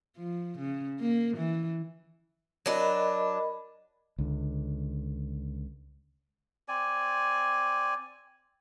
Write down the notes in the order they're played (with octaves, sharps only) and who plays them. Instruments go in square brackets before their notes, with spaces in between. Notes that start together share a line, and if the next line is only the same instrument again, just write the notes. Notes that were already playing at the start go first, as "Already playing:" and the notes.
[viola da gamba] F3
C#3
A#3
E3
[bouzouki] F#3 D4 [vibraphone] A#4 D#5 B5
[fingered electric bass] C#2 D3
[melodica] C4 D5 G#5